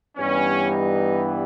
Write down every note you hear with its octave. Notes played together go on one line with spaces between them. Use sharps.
G2 E3 G3 B3 C#4
D#4